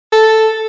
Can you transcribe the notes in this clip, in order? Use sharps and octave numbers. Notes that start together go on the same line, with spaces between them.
A4